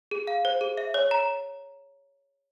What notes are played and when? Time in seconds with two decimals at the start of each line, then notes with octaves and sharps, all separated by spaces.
0.11 G#4
0.27 F5
0.45 C5
0.61 G#4
0.77 E5
0.94 C#5
1.11 A#5